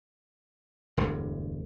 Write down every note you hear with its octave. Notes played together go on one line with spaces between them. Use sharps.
E1 D2 G2